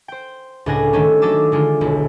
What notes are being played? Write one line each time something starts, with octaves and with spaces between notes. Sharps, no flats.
C5 G5
C#2 A2 D4 F#5 G#5 A#6
D#3 G3 A3 C#4 D4
F#3 A4 D#5 D6 E6
D3 G#3 D4 F4
D#1 B1 E4